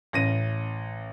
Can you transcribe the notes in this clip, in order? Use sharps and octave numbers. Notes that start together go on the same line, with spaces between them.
A1 A#6 D#7